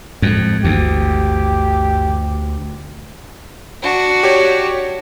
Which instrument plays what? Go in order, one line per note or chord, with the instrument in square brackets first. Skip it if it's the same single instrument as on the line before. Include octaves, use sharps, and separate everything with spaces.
[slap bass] F2 [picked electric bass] A2 G#3
[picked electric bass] G1 E3 [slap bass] D2 [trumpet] G4
[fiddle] D4 F#4
[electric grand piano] G4 C#5